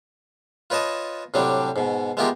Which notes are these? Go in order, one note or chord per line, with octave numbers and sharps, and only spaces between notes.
F4 B4 C#5 D#5 A5
A2 C3 F#3 G3 C4 D4
G#2 B2
G#3 B3 E4 F4 G4 A#4